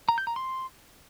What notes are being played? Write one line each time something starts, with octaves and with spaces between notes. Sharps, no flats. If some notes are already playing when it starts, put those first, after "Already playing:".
A#5
G6
A#5
C6